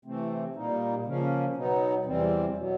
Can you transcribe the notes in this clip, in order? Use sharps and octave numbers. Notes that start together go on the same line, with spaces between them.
C3 E3 A3 C4
A#2 G3 A#3 D#4
C#3 F3 A#3 C#4
B2 F#3 B3 D#4
E2 C3 E3 G3 C4
B2 F#3